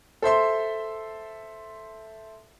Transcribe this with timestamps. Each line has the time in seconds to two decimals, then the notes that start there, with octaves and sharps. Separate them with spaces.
0.22 A4 C5 E5 C6